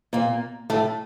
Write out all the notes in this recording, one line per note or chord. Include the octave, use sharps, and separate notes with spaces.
A#2 A#3
A2 A3